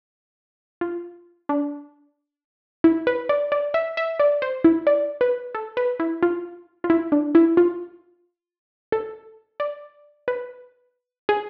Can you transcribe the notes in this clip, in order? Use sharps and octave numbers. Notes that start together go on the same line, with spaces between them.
F4
D4
E4
B4
D5
D5
E5
E5
D5
C5
E4
D5
B4
A4
B4
E4
F4
F4
E4
D4
E4
F4
A4
D5
B4
G#4